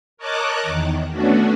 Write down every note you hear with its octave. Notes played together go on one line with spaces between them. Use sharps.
A#4 C#5 D#5 A5 D6 F#6
E2 D#3
A3 B3 C#4 D4 F#4